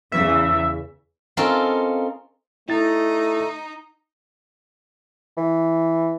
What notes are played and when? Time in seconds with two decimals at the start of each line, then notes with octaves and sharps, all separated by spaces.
0.12 E2 C#3 E3 E5
1.37 C4 C#4 D#4 F4 A4 A#4
2.69 A3 D#4 E4 A6
5.37 E3